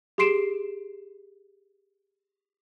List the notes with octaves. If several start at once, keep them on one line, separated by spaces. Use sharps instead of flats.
G4 G#4 C6 C7 D7 E7